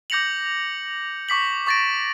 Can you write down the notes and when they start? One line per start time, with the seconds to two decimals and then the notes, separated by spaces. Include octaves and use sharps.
0.10 D6 G6 A#6 C#7 F7 F#7
1.29 C#6 D6 B6 F#7
1.67 C#6 D6 A6 A#6 D7